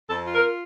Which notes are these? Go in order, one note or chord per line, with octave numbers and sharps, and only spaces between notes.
F2 A4
F4
A#4